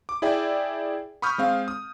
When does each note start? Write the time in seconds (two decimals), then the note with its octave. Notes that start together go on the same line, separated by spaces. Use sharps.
0.09 D6
0.22 E4 G#4 D5 E5 G5
1.22 B5 C#6 D#6 F6 G6
1.38 G#3 C4 F5
1.68 D#6